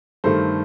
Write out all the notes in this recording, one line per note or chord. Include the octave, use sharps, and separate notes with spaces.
G2 D#3 A3 A4 C5